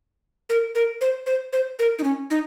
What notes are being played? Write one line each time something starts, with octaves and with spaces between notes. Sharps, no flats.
A#4
A#4
C5
C5
C5
A#4
D#4
C#4
D#4